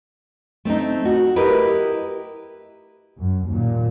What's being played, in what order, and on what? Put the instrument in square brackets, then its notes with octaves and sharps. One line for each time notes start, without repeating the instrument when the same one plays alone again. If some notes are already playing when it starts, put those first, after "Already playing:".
[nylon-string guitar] A3 C4 D4 D#4
F#4
E4 G4 A#4 B4 D#5
[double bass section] F#2
D#2 A#2